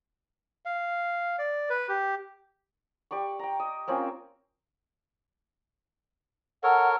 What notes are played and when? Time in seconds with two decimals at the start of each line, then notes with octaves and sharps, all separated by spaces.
0.65 F5
1.39 D5
1.70 B4
1.89 G4
3.11 G4 D5 B5 C#6
3.39 G5 A#5
3.60 D#5
3.87 A#3 C4 C#4 F4
6.63 A4 A#4 C#5 F#5